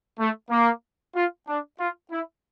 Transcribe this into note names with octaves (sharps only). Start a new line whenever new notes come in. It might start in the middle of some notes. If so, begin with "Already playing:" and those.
A3
A#3
F4
D4
F4
E4